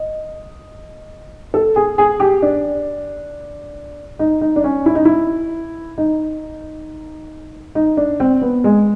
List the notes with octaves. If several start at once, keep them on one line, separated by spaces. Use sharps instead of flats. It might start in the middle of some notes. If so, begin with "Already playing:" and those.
Already playing: D#5
A4
G#4
G#4
G4
D4
D#4
D#4
D4
C#4
E4
D#4
E4
D#4
D#4
D4
C4
B3
G#3